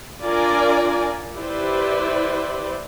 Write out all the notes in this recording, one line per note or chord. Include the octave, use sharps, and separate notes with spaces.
D4 F4 A#4 D5 G#5
E4 G4 B4 C5 D5